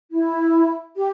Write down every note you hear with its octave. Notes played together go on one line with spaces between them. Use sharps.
E4
G4